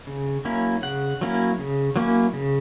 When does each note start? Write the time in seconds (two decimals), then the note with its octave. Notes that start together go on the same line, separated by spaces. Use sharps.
0.07 C#3
0.45 F#3 A#3 C#4 E4
0.82 C#3 F#5
1.21 F#3 A#3 C#4 E4
1.59 C#3
1.96 F#3 A#3 C#4 E4
2.33 C#3